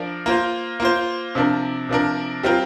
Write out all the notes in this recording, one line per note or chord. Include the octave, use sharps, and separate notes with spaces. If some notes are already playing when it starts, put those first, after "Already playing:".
Already playing: F3 D4 A#4 D5
A#3 F4 C5
A#3 F4 C5
C3 F3 D4 A#4
C3 F3 D4 A#4
G3 C4 F4 A#4